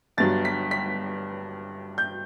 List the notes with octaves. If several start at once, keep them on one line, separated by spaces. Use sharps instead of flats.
G1 G2 F#3 A6
B6
B6
G6